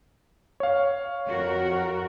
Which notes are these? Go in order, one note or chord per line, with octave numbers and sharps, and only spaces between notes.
C#5 F5
F2 F#4 A#4